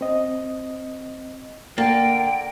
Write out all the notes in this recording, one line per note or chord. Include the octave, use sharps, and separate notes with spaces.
C4 D#5
D3 A#3 G5 A6